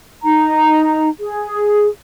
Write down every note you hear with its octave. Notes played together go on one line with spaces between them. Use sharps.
D#4 A#5
G#4